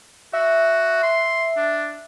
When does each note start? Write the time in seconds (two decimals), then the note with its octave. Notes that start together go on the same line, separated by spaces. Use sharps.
0.33 F#4 E5
1.03 C6
1.57 D4